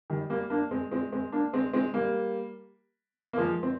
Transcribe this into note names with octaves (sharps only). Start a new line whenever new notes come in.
D#3 G3
G3 A#3
A#3 D4
G#3 C4
G#3 C4
G#3 C4
A#3 D4
G#3 C4
G#3 C4
G3 A#3
A#3
F3 G#3
C4